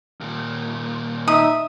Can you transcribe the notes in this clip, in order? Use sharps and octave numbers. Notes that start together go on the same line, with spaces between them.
D#2 A#2
D#4 E5 D#6